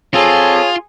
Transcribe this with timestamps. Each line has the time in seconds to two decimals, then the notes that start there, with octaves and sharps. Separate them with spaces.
0.14 C4 F4 G#4 A4 C#5